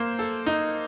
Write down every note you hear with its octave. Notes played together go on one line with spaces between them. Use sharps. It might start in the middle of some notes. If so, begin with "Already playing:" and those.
Already playing: A#3 C5
A4
D#4